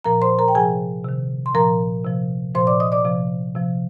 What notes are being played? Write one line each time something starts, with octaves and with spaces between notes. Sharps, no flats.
A#2 F3 A#4 A#5
C5 C6
A#4 A#5
G5
C3 F3 G#4 G#5
C3 D#3
C6
A#2 F3 A#4 A#5
C3 F3
A#2 F3 C5 C6
D5 D6
D#5 D#6
D5 D6
C3 F3
C3 F3